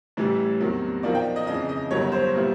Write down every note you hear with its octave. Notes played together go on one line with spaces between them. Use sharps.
A1 A2 E3 G3
E2 C3 D#3 F#3
B1 A#2 F3 A#3 D#4 D5
G5
D#5
F2 C#3 E3 D#5
D#5
G1 G2 D#3 F#3 C#5
C5
A#2 G3 B3 E4